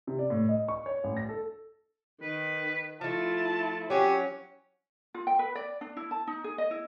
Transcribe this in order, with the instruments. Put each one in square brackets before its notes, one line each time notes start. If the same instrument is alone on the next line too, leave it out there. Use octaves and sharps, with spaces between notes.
[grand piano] C3
D5
A2
D#5
C#6
C#5
A1
A#6
A4
[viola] D#3 [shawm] B4
[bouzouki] F3 A3 [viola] E4 F4 [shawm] A5
[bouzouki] F#3 C#4 [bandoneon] G4 [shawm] C#5
[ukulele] F4
G5
B4
D5
D4
E4
A5
D#4
G#4
D#5
E4